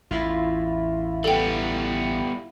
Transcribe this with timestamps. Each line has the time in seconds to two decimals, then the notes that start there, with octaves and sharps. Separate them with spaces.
0.11 A1 E2 A2 E4 F4
1.24 G3 B3 A4 G5